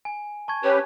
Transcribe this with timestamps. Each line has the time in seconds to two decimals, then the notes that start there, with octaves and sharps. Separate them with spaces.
0.05 G#5
0.48 A5 C#6 G#6
0.64 C#4 G4 B4 C#5